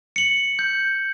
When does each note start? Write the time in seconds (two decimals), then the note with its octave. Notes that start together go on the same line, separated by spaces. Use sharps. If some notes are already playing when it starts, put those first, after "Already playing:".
0.16 C#7 F#7
0.59 G6